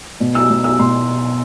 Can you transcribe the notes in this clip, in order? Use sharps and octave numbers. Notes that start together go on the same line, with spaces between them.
B2
B1 E6
B2
B1 E6
B2 C6